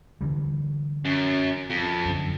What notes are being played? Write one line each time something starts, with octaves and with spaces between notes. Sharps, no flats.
D3 E3 G3
F#2
F2
F#2 D3